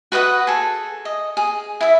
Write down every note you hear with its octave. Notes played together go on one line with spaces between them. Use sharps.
F#4 B4 D#5 F#5
G#4 A4
D#5
G#4
E4 E5